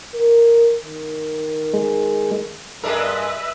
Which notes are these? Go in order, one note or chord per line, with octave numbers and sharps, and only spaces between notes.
A#4
D#3
G#3
G2 G#3 D4 A#4 B4 D#5 E5